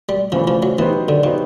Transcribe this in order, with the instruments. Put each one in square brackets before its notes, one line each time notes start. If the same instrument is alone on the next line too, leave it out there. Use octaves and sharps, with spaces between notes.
[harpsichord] G3
[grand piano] C#3 E3 A3 [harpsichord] F3
[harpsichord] F3
F#3
[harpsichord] E3 [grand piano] F#3 B3 D#4 G4 C5
[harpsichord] D3
[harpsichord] C#3 [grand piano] F#3 B3 D#4 G4 C5